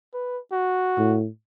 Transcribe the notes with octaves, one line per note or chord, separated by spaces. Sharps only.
B4
F#4
A2